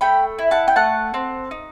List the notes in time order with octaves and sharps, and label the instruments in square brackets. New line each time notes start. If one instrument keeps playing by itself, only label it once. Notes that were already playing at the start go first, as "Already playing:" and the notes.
[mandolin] A3 G5 B5
E4
F#5 A5
G5
A3 F#5 A5
C4
D#4